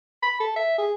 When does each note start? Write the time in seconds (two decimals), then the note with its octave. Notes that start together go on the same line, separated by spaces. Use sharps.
0.23 B5
0.40 A4
0.56 E5
0.78 G#4